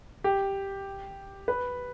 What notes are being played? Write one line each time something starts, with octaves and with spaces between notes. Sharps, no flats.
G4
B4